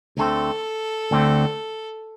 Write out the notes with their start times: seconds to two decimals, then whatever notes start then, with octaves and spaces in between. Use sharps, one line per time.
0.17 D2 D3 A3 C4 A4
1.11 D2 D3 A3 C4